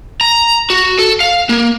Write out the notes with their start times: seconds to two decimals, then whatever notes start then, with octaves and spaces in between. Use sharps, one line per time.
0.21 A#5
0.70 F#4
0.99 A4
1.20 F5
1.49 A#3